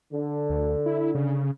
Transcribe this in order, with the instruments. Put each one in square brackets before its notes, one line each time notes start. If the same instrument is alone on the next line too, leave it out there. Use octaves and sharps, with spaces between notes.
[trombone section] D3
[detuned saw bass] D2
E4
C#3